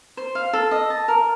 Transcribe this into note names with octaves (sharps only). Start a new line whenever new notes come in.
C5
F5
A4
D#5
A5
A#4